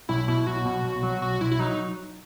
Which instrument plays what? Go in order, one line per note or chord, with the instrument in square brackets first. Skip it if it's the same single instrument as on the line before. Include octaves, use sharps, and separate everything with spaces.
[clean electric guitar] B1 [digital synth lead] E4
[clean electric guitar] B2 [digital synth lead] E4
[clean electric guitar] B1 [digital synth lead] F#4
[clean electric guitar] B2
B1
F#3
[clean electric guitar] B1 [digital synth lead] F#4
[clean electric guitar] B1 [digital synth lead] E4
[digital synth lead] E4
[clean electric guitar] F#3 [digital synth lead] D#4